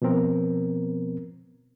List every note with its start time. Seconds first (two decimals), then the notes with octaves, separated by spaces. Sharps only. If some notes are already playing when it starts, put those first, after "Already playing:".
0.02 B2 F3 B3 C4 A#4